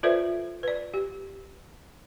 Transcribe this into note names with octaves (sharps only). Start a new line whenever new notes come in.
F4 A4 B4 C5 D5 E5
B4 D5
G4